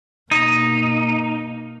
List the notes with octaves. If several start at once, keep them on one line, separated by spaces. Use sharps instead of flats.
B2 A#3 D#4